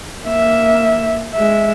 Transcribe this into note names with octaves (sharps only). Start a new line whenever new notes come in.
A#3 E5
G#3 E5